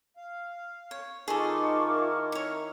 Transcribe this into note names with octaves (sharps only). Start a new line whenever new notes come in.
F5
C#5
D#3 D#4 F4 G#4 A4 C#6 D6
E4 A#4
C#5 C#6